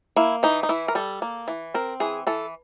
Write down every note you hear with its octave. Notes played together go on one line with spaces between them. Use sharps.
A#3 E4
E3 D#4
D#4
E3 E4
A#4
G3 A4
A#3
E3
C4 A#4
E3 G#4
E3 A4